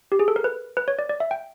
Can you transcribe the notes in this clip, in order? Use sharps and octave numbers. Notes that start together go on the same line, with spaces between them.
G4
G#4
A4
A#4
B4
B4
C#5
D5
D5
E5
G5